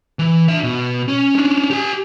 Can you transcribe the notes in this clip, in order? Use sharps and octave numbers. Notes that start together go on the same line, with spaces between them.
E3
D4 E5
B2
C#4
C#4 D4
G4 G#5